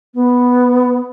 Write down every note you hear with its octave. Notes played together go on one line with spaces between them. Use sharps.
B3